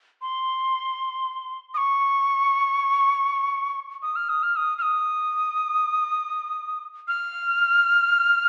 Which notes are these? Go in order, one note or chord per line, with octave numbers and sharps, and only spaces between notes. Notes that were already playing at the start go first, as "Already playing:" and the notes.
C6
D#6
C#6
D#6
F6
D#6
F6
D#6
F6
D#6
F6